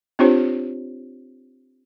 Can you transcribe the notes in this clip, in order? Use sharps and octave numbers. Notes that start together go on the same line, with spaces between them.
C4 D4 F4 G4 C5 C#5